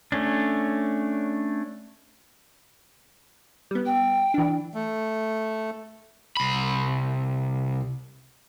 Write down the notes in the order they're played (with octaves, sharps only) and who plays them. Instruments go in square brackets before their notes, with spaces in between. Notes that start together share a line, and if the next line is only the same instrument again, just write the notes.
[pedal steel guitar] A3 C#4 D4
[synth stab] G3 B3
[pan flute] G5
[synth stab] E3 D4
[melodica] A3
[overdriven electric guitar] C2 B5